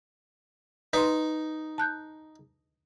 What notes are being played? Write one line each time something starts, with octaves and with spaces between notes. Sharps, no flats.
D#4 B4 C6
A5 F#6 G6